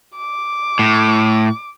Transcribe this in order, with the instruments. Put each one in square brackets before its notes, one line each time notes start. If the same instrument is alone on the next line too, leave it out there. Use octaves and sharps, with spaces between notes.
[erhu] D6
[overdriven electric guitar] A2